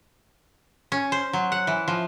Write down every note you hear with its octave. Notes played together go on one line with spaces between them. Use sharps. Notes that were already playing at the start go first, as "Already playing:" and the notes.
C#4
C5
F#3
F#5
E3
F3